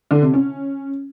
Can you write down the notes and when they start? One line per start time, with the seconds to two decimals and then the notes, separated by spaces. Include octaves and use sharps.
0.11 D3
0.22 C3
0.34 C#4